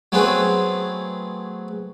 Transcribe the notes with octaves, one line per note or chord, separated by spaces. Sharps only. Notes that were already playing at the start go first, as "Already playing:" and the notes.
F#3 A3 B3 C4 G#4 B4